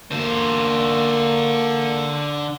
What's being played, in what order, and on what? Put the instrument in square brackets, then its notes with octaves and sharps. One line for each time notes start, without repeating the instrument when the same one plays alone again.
[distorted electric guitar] D3 C5 [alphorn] A#3